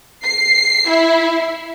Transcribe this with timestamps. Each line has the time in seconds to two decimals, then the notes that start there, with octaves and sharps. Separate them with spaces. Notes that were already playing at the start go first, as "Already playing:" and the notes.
0.24 C7
0.89 E4